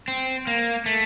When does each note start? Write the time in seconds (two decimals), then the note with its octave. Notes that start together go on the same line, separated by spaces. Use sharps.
0.08 C4
0.47 A#3
0.86 A3